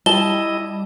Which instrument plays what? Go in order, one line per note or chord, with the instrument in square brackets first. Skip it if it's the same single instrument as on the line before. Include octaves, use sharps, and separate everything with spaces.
[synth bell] G3 [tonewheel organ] E4 D#5 [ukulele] A5 [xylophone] G7